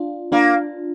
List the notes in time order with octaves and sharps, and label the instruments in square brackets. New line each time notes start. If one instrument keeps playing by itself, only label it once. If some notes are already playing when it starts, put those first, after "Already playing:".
Already playing: [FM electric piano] D4 F4
[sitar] A#3 [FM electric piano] D4 F4